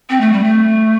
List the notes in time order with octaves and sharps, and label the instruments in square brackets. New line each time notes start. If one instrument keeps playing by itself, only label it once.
[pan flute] C4
A3
G3
A3